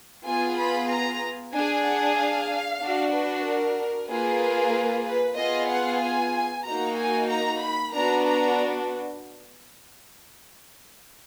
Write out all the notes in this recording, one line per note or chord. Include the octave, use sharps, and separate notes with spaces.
B3 F4 G#4 G#5
B5
A#5
D4 G#4 G#5
F#5
F5
D4 F#4
B4
A#4
A#3 F4 G#4 B4
B4
B3 F4 G#4 D#5
F#5
G#5
A#3 D#4 F#4 A#5
G#5
A#5
B5
B3 D4 F#4 A#5
A#5